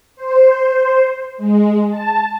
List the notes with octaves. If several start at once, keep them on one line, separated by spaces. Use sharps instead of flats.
C5
G#3
A5